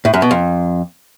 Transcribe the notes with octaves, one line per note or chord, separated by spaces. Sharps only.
A2
F#2
B2
F2